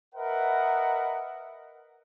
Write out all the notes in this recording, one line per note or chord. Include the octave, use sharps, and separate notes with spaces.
A#4 B4 D#5 E5 F#5